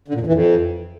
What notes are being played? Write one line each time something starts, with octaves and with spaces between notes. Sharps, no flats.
D3
A#2
F2
E3
F2